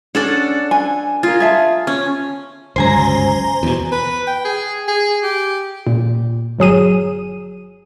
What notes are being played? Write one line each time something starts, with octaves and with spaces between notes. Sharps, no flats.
C#4 D4 A4 D5 F#5
G#5
F4 G#4 A#4
G#4 E5 A5
C#4
G1 C#2 F#2 C5 G#5 A#5
E2 B2
B4
G5
G#4
G#4
G4
A#2
G1 F#3 G#4 D#7